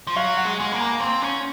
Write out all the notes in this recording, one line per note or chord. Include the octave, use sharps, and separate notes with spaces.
F3
F#3 F5
F#5
G#3
G#3 G#5
A#3
A#5
A#5
C4 G#5
C#4